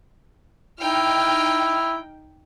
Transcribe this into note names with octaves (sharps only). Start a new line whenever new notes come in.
D#4 E4 G5 F6